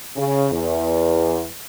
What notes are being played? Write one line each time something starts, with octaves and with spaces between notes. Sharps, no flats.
C#3
E2